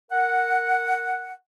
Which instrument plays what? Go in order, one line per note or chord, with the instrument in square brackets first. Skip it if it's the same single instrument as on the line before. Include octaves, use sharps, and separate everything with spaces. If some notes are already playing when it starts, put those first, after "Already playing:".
[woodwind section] A#4 F#5